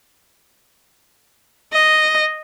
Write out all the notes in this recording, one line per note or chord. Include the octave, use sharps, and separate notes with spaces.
D#5